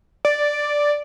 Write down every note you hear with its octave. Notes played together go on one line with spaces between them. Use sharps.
D5